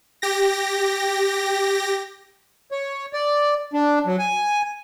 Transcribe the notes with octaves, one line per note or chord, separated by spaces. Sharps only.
G4 A#6
C#5
D5
D4
F#3
G#5